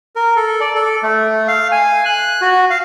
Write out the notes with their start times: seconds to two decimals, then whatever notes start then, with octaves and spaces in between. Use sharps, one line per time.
0.16 A#4
0.36 A4
0.60 D5
0.75 A4
1.03 A3
1.48 F5
1.72 G#5
2.06 F#6
2.42 F#4
2.70 F5